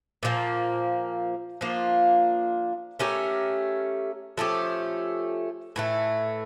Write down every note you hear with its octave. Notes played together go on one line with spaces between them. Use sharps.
A#2 F3 A#3
F3 A#3 D4 F4
A3 C#4 G4 A#4
F3 A3 C#4 G4
A2 E3 A3